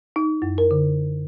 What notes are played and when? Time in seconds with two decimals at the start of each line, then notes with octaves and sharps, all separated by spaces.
0.16 D#4
0.42 F#2
0.58 A#4
0.71 D3